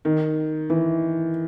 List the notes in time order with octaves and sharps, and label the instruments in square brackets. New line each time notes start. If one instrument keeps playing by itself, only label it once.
[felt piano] D#3
E3